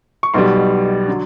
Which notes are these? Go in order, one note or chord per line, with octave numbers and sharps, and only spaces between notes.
C#6
B1 B2 G3 C6
D3 F#3